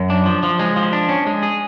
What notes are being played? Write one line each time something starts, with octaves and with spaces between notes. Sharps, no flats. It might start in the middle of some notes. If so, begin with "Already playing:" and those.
Already playing: F#2
D4
F3
F3
G#3
F3
D4
C#4
G#3
G#4